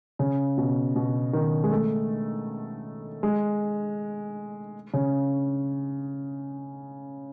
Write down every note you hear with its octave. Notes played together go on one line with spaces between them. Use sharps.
C#3
B2
B2
D#3
G#3
A3
G#3
C#3